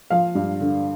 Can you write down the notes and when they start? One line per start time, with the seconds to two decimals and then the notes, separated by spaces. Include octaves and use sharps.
0.10 F3 F5
0.35 G2
0.60 D3